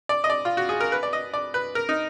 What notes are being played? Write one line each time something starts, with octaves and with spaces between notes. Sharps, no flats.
D5
D#5
D5
F4
F#4
G#4
A#4
B4
D5
D#5
D5
B4
A#4
D#4